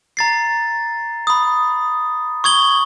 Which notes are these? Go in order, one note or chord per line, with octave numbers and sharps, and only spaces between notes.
A#5 A6 C7
B5 D#6
C#6 D#6 G#6 F#7 G7